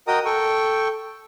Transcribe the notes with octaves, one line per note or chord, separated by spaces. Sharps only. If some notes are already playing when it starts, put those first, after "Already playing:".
F#4 A#4 D#5 G5 A#5 D#6
A4 G5 C#6